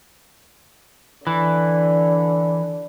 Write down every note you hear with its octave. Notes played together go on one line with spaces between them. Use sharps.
D3 E3